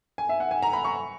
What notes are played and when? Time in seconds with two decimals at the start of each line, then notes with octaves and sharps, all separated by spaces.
0.18 G#5
0.29 E5
0.40 F#5
0.51 G#5
0.62 A#5
0.73 B5
0.85 C#6